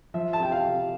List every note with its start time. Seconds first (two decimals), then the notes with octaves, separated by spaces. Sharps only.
0.14 F3 E5
0.33 A5
0.40 C3 G5
0.52 F5
0.65 C3